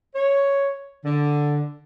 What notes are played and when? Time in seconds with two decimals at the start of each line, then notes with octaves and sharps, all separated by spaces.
0.14 C#5
1.05 D3